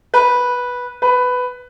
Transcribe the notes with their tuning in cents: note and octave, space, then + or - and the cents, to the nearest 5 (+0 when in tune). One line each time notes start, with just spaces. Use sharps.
B4 -10
B4 +10